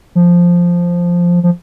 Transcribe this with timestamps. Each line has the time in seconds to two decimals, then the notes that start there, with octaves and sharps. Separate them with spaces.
0.15 F3
1.43 F3